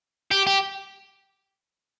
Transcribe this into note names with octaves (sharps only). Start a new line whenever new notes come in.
G4
G4